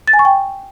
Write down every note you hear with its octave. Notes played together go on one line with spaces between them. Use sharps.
A6
G#5
C#6
G5